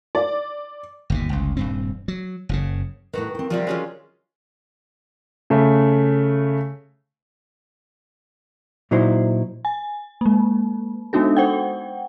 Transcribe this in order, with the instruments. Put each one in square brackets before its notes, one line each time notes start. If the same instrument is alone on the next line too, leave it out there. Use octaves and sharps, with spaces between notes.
[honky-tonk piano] D5
[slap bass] G1 D#2 B2
G1 C#2
D#1 G2 C4
F#3
F#1 A#2 C#3
[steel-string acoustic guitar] A2 B4 [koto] D#3 F#4
[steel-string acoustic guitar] C4 G5
[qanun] C3 G3 F4 [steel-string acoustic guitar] F3
[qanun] F#3 C#4 F4 [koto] G#3
[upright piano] C#3 A3
[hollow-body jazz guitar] A#2 F#3 D#4 E4 C5
[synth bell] G#5
G#3 A#3
G#3 B3 D4 D#4 F#4 A4
C5 F#5 G5